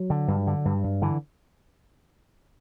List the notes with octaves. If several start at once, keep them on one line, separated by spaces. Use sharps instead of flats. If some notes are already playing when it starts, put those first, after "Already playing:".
Already playing: F#3
D3
G2
D3
G2
G2
D3 E3